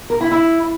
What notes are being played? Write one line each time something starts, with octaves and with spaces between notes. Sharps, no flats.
A#4
E4
E4